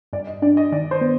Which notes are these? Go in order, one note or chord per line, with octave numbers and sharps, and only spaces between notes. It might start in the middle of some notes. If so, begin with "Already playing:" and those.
G2 D5
D#5
D4 D5
D#5
D#3 D5
C5
B3